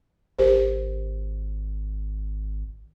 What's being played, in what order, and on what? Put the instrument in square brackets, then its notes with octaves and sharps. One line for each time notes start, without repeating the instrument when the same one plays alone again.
[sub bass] G#1 [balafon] G4 A#4 C5